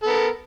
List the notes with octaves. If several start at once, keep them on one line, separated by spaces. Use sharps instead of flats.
B3 A4 A#4